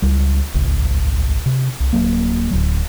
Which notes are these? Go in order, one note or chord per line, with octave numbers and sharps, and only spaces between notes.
C#2 G3
D#1 G#1 C#2
C3
C2
D1 C#2 F#3 A#3
D1 F#3